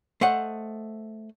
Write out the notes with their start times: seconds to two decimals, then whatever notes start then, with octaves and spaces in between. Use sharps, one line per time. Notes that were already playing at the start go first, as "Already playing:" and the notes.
0.21 A3 C5 D#5 F#5